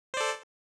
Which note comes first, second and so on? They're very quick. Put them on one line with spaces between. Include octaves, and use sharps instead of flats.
C5 D5 A4